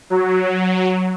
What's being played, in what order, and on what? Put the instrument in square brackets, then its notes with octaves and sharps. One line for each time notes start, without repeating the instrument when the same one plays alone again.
[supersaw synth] F#3